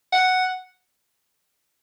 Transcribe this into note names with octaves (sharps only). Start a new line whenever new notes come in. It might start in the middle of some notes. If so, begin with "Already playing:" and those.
F#5